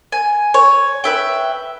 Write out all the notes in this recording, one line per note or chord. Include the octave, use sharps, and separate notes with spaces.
G#5
C#5
B4 E5 G5